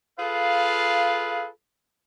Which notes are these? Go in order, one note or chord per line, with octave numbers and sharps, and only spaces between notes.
F4 G#4 A4 B4 F5